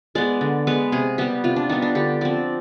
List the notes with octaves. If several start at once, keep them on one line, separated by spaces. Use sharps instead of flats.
G#3 B3 D5
D3
G#3 B3 B4
C3 G#4
G3 B3 G4
C3 F4
D4
G3 B3 D#4
D4
D3 G4
F3 C4 D5